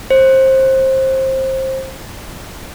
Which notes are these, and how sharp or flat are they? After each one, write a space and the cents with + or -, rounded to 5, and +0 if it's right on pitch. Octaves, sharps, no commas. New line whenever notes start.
C5 +20